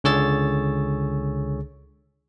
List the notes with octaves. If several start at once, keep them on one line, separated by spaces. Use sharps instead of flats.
C#2 D3 G#4 C#5 E6 A6